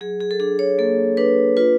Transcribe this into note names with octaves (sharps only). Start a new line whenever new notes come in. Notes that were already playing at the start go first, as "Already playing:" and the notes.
F#3 G#4
G#4
A4
D4 G#4
C#5
A#3 A4
D4 B4
F4 B4